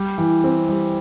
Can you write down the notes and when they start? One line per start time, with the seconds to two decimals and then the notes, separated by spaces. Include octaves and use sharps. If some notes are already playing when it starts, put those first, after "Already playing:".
Already playing: G3
0.18 E3
0.44 C4
0.69 G3